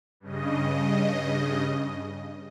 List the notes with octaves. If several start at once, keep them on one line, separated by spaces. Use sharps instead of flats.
G2 C#3 D#5